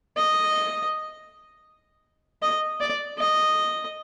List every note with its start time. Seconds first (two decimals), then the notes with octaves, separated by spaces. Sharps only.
0.17 D#5
2.42 D#5
2.80 D5
3.18 D#5